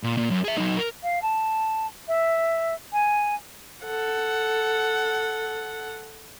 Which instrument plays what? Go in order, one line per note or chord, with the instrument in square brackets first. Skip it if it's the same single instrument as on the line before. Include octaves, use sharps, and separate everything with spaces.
[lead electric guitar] A#2
A#2
F#2
G#4 E5
F#3 D#4
A#4
[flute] F5
A5
E5
G#5
[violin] A4 F#5